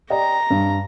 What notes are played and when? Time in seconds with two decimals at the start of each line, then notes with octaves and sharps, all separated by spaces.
0.10 G4 D5 D#5 A#5
0.50 G2